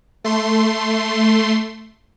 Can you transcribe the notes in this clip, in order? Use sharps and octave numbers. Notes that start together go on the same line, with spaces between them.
A3 C6